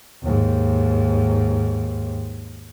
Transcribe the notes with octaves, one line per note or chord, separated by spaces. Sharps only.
D#2 G#2